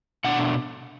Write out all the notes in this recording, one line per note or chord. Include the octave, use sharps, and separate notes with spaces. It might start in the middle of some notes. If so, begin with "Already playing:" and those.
B2 A3 D4 F#5